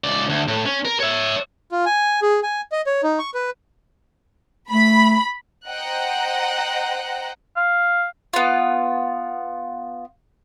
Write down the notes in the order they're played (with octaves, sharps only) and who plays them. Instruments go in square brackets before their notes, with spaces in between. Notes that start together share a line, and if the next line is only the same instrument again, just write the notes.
[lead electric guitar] C#2 D5
D2
A2
C#4
A#4
C#5 E5
[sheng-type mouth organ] F4
G#5
G#4
G#5
D#5
C#5
D#4
C#6
B4
[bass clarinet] A3 [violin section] B5
[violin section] C5 D#5 F#5 G5 A#5 F#6
[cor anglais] F5
[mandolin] B3 F4